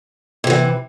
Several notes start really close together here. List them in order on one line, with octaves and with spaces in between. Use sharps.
C3 F#3 E3